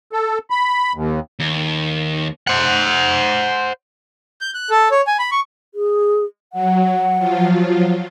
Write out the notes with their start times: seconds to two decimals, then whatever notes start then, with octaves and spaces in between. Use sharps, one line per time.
0.13 A4
0.50 B5
0.95 D#2
1.39 D#2
2.47 C5 F#5
4.41 G6
4.54 F#6
4.70 A4
4.91 C#5
5.07 G#5
5.19 B5
5.32 C#6
5.75 G#4
6.53 F#3 F#5
7.19 F3 F#3 F4